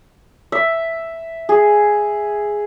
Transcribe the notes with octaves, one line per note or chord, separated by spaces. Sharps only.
E5
G#4